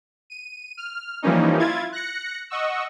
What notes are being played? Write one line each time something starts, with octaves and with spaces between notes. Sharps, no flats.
D#7
F6
E3 F3 G3 A#3 C#4 D#4
E4 F4 G#6 A6
F#6 A#6 C#7
D#5 F#5 C#6 E6